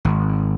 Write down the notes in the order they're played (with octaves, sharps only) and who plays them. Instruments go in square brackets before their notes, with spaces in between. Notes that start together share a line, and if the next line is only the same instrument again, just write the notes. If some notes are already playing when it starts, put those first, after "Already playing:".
[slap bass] G#1